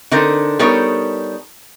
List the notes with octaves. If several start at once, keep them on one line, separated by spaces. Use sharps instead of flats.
D3 C4 D#4 A4 A#4
G3 B3 D#4 A4 A#4 C#5